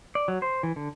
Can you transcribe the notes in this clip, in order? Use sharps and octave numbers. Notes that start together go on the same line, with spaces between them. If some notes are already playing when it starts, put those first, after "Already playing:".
D5
F#3
C5
E3
D3